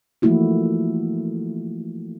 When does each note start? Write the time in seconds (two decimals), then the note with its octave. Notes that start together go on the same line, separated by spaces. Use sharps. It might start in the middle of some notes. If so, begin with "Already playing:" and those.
0.22 E3 F3 A3 A#3 E4 F#4